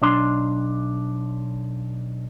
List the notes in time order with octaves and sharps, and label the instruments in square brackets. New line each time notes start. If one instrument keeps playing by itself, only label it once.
[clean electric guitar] B1 D4 C6